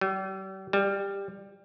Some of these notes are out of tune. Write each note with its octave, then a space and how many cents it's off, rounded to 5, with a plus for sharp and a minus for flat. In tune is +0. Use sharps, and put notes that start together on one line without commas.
G3 -40
G3 +15